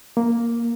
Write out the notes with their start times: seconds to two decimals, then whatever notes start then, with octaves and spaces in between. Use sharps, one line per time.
0.17 A#3